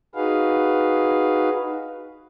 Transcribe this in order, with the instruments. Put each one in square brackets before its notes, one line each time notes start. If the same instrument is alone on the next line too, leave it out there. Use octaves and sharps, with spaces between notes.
[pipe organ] D#4 F#4 G#4 B4 F5